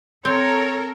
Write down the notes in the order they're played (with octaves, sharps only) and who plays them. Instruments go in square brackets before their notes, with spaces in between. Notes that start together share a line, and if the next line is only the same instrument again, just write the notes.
[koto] C4 [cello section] A4 A#4 [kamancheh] C#5